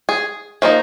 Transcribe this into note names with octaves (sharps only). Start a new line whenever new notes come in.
G#4
F3 A#3 D#4